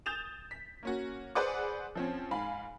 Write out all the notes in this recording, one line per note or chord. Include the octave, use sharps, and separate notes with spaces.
D#6 G6 A6 E7 F7
B6
A#3 C#4 F#4
G#4 B4 C5 D5 F#5 D6
F3 C4 C#4
G#2 F5 G#5 B5